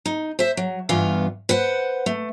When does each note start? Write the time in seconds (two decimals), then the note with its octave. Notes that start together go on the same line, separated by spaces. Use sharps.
0.06 D#4
0.39 C5 E5
0.57 F#3
0.89 G2 E3 B3 F4 F5
1.49 B4 C5 F#5
2.06 A3